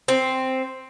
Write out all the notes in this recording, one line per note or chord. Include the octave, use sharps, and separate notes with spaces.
C4